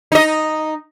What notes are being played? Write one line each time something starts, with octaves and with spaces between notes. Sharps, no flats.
D#4 D#5